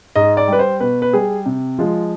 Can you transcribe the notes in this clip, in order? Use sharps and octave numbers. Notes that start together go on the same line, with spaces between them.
G#2 D#5
D5
G3 B4
C5
B2 B4
B4
G3 G#4
C3
F3 G#3 F4